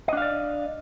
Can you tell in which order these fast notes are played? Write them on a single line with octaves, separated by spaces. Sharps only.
D#5 D4 F5 D5